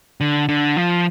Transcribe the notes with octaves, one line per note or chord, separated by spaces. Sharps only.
D3
D3
F3